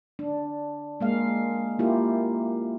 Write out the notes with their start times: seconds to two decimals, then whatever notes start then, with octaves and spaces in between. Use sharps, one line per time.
0.19 D4
1.00 G#3 A#3 F5
1.79 A#3 E4 F4 G4